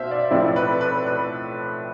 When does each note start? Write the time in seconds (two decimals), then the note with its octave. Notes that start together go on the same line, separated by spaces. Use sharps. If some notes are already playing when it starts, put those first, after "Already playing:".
Already playing: B2 C5 E5 F5
0.11 D5
0.31 A2 F3 C4 E4 D5
0.56 B4
0.81 B4
1.07 B4